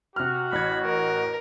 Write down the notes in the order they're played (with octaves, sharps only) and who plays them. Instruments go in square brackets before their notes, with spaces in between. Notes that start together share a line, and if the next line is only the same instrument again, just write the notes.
[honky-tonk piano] C3 F6 [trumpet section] F#4
[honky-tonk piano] A1 G#6 [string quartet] B5
[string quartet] A#4